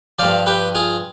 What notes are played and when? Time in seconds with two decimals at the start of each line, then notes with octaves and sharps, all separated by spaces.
0.19 G2 F3 D5 F5
0.46 G4 B4
0.75 F4 G#4